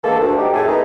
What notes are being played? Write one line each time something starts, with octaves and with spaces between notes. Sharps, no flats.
D3 E3 G#3 A#3 A4
D2
F#3 G3 D#4 G4
F#2 A2 A3 E4 G#4 A4
G#3 A3 B3 D#4